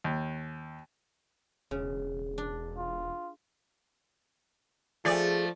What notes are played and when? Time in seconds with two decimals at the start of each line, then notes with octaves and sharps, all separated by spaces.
0.04 D#2
1.71 E1 C#3
2.38 D4
2.78 F4
5.05 F3 A3 G#4 D5